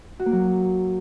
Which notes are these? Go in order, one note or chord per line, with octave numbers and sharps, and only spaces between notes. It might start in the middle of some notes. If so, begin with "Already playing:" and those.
F#4
A#3
F#3